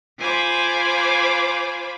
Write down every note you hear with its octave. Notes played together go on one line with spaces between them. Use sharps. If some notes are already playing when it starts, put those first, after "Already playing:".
F4 C5 G#5 B5 D6